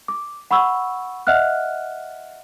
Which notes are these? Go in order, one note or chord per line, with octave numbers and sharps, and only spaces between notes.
D6
F#5 B5 C#6 E6
D#5 E5 F#5 F6 F#6